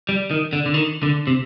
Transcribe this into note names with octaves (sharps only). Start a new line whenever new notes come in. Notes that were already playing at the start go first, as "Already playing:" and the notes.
G3
D#3
D3
D3
D#3
D3
C3